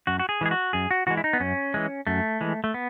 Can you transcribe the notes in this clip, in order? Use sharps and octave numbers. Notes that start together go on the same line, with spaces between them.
F#2 F#4
F#4
G#4
E3 G#3 G#4
F#4
F#2 G#4
F#4
E3 G#3 F#4
E4
D#4
B3
F#2 C#4
E3 G#3
F#2 A3
E3 G#3
A3
B3